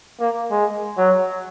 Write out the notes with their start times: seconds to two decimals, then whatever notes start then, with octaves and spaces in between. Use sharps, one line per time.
0.20 A#3
0.51 G#3
0.97 F#3